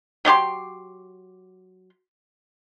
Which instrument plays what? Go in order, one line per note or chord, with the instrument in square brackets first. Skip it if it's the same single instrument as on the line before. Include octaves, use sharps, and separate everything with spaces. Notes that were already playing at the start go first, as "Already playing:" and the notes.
[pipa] F#3 A3 G4 C6